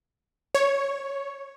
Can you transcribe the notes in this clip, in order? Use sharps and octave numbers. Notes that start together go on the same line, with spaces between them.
C#5